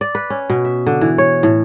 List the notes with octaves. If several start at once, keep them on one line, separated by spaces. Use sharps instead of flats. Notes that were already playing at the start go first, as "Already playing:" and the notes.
D5
B4
C#4
B2
E5
D3
E3
C#5
A2